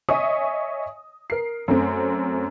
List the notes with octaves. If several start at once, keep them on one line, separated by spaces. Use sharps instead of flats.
C#5 D#5 E5 G#5 C#6 D#6
A#4 C7
F#2 A3 C4